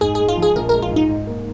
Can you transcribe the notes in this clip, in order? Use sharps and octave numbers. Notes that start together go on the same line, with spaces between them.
G#2 G#4
G#3 G#4
F4
F3
G#4
A#1 A#4
G#3 A#4
F4
G#2
D#4
G#2
A#3